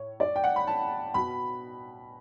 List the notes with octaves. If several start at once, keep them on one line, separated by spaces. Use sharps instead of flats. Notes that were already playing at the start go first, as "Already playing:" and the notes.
Already playing: A2 C#5
D5
G5
F#5
B5
A5
B2 B5